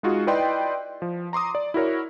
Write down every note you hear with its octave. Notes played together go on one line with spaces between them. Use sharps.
G#3 D#4 F4 F#4 G#4
E4 B4 D5 D#5 G5 C6
F3
A#5 C6 D6 D#6
D5
E4 F#4 A#4 C#5